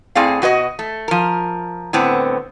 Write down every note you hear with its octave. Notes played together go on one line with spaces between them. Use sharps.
A2 C4 G#4 D5 F5
B2 F#4 C5 D#5
A3
F3 A#4
A2 D3 B3 C4